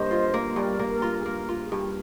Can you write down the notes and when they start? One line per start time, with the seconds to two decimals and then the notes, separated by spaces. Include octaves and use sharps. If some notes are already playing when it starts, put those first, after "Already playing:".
Already playing: G2 A#3 C5 D#5
0.11 F4
0.34 A#3
0.56 G2 A#4 D5
0.79 A#3
0.91 A#4
1.02 F4
1.19 G#4
1.26 A#3 A#4
1.49 F4
1.60 G#4
1.72 G2